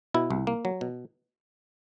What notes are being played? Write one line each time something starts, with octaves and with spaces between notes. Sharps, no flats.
B2 E4
C2
A#3
F#3
B2